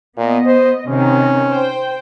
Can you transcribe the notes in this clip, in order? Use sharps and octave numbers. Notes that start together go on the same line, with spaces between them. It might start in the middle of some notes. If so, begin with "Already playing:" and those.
A#2 B3 D#5
C5
C3 D#3 C#4
C5 G5